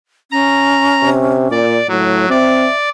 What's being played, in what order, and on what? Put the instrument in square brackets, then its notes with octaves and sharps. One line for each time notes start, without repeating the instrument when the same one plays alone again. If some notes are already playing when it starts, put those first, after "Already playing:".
[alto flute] C#4 [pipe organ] A#5
[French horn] C3
[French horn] A#2 [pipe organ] D5
[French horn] A2 [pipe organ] F#3
[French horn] C4 [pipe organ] D5 [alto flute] E5